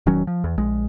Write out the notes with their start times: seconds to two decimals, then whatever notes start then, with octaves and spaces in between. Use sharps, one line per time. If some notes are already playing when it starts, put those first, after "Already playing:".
0.06 E1 D#3 F#3 C#4
0.27 F3
0.44 E2
0.58 A#1 G#3